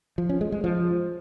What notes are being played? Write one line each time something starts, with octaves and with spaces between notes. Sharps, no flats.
F3
C#4
G#3
G#3
F3